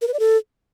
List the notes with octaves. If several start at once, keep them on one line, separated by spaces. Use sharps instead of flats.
A#4
B4
D5
A4